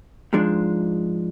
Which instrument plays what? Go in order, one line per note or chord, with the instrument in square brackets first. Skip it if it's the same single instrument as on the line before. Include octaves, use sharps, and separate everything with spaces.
[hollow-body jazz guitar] G#2 F3 G#3 D4